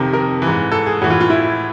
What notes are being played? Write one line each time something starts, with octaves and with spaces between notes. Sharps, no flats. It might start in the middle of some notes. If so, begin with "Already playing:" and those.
Already playing: F2 C3 D#3
A#4
E3
G#2
A4
G#4
A2 E3 F#4
F4
F4
E4